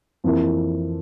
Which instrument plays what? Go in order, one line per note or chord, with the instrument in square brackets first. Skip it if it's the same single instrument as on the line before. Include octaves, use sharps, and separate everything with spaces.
[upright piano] F2 E3 A#3 E4